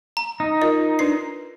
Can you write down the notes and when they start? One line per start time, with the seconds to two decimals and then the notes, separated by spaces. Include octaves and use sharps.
0.17 A#5
0.40 D#4
0.62 F4 A#4 D#5
0.99 D4 B4 D5 C7